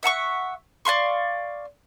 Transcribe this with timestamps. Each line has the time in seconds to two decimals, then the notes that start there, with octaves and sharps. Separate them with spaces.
0.03 E5 F#5 A5 C#6
0.85 D5 F5 C6 C#6